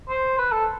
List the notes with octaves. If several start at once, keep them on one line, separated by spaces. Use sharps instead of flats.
C5
B4
A4